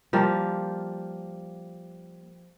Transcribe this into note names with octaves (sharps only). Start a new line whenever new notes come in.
F3 G3 A#3 F4